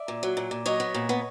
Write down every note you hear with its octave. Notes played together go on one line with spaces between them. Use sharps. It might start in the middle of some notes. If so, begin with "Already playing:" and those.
Already playing: D5 E5
A#2
F#3
A#2
A#2
F#3 C#5 D#5
B3
A#2
B3